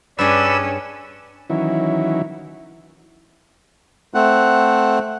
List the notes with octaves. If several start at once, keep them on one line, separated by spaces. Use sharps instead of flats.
G2 C#4 D4 G#4 B4 D5 E6
D#3 E3 F#3 C#4 E4
A3 C4 F#5